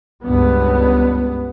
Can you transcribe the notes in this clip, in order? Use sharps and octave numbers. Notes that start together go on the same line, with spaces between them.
C#2 G2 B3